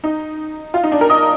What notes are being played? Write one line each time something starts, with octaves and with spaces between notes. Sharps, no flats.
D#4
F4
D#4
D4
A#4
D#5